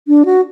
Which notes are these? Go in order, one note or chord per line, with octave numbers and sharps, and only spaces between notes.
D4
F#4